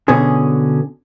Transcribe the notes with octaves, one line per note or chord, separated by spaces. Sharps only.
B2 D3 C#4 G#4